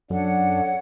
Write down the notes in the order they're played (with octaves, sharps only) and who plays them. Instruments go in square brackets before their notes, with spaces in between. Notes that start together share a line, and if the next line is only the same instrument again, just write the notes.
[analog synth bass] F#2 [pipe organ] D4 [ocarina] A4 [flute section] C#5 F#5